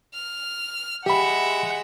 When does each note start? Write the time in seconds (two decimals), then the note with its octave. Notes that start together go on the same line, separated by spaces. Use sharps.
0.14 F6
1.06 G#3 G4 E5 F#5 B5